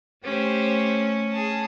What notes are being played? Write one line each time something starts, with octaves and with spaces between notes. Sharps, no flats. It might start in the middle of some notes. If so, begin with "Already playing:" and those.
A3 C#4 G4 C5
G#4 A5